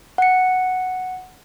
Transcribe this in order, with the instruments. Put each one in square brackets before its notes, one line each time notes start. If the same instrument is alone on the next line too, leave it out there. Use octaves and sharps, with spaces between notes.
[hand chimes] F#5 C#7